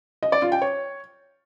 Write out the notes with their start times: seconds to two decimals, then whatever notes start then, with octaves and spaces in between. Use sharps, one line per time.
0.23 D#5
0.32 D5
0.42 F4
0.52 G5
0.62 C#5